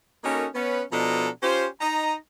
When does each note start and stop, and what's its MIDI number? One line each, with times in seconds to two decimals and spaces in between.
0.24 0.46 58
0.24 0.46 61
0.24 0.46 63
0.24 0.46 66
0.24 0.46 69
0.24 0.46 70
0.55 0.83 59
0.55 0.83 61
0.55 0.83 71
0.92 1.28 47
0.92 1.28 53
0.92 1.28 62
0.92 1.28 69
0.92 1.28 75
0.92 1.28 82
1.43 1.67 61
1.43 1.67 65
1.43 1.67 67
1.43 1.67 72
1.81 2.15 63
1.81 2.15 75
1.81 2.15 82